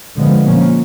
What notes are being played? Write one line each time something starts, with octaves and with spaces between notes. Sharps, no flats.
D3 F3 G#3 B3
A#2 F3 A#3 C#4